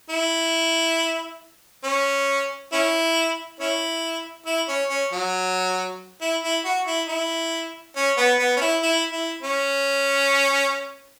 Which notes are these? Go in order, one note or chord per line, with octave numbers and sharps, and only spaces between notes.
E4
C#4
C#4 E4
C#4 E4
E4
C#4
C#4
F#3
E4
E4
F#4
E4
E4
C#4
B3
B3
C#4
E4
E4
E4
C#4